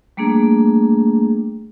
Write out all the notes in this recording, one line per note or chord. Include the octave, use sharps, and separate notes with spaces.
G3 A3 A#3 D4 G#4